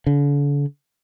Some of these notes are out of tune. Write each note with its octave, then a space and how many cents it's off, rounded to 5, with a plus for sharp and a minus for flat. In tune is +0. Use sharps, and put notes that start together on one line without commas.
D3 -40